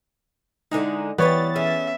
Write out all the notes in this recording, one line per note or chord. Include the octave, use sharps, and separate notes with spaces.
D3 G#3 D#4 E4
E3 G3 B3 B4 C#5 A6
C#4 G#4 E5